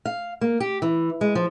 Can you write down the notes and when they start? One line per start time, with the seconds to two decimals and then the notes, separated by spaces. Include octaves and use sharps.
0.05 F5
0.41 A#3
0.60 G4
0.82 E3
1.21 G#3
1.35 F3